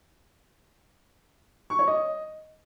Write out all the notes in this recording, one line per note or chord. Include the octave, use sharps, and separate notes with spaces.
C#6
C#5
D#5